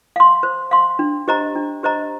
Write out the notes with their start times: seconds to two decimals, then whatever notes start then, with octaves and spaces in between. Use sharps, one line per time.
0.16 F5 C6
0.43 C5
0.71 F5 C6
0.99 D4
1.28 G4 C5 D#5 A#5
1.55 D4
1.83 G4 C5 D#5 A#5